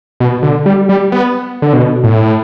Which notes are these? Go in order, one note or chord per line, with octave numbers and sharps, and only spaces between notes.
B2
D3
G3
G3
B3
D3
B2
A2